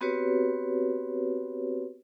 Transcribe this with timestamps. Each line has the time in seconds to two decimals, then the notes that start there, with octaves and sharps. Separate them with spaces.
0.01 B3 C4 F#4 G4 B4 C#5